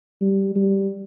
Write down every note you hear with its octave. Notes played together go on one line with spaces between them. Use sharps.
G3
G3